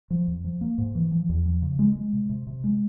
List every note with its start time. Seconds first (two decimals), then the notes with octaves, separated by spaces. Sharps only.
0.10 F3
0.28 F2
0.44 F3
0.61 A#3
0.78 G#2
0.95 E3
1.12 F3
1.29 E2
1.45 F3
1.62 C#3
1.79 G#3
1.96 G#3
2.13 C3
2.29 C3
2.47 C3
2.64 G#3